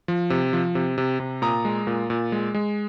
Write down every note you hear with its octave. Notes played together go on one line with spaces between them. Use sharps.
F3
C3
F3
C3
C3
C3
A#2 A#5 D#6
G#3
A#2
A#2
G#3
G#3